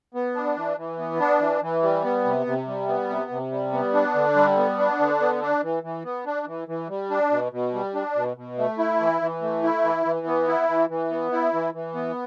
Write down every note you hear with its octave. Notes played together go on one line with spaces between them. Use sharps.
B3
D4
E3
E3
B3
D4
E3
E3
G3
B3
C3
C3
G3
B3
C3
C3
G3
B3
D4
D3
G3
B3
D4
D3
B3
D4
E3
E3
B3
D4
E3
E3
G3
D4
B2
B2
G3
D4
B2
B2
A3
E4
E3
E3
A3
E4
E3
E3
B3
E4
E3
E3
B3
E4
E3
E3
B3